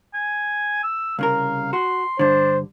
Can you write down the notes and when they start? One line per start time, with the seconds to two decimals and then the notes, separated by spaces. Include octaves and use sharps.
0.14 G#5
0.83 E6
1.19 C2 C#3 A#4 F5
1.73 F#4 C6
2.19 G2 D3 D4 C5